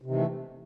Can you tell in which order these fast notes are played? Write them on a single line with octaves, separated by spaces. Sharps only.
C3 D#3 E3 A3